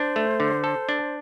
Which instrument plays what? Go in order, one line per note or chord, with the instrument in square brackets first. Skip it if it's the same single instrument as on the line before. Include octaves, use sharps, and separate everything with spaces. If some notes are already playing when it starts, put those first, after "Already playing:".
Already playing: [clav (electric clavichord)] D4 [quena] C5
[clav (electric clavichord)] A3
D3
A4
D4